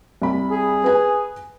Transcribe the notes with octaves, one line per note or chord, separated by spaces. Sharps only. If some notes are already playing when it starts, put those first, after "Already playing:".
C2 B5
G#4
B4 G#5